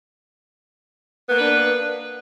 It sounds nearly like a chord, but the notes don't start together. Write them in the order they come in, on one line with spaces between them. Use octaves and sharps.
B3 A#3 B4 D4